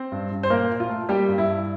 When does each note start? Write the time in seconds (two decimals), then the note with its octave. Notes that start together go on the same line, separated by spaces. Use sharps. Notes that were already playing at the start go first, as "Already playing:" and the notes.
Already playing: C4 C5
0.12 G2
0.31 G2
0.43 C5
0.50 A#2 A#3 A#4
0.70 A#2
0.80 F4
0.89 A3
1.09 G3 A#3 G4
1.29 G2
1.38 E4
1.48 G2